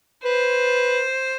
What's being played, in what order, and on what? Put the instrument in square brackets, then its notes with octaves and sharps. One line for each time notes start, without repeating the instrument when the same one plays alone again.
[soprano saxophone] B4 [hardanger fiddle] C5